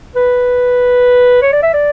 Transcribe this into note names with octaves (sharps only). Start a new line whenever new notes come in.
B4
C#5
D5
E5
D5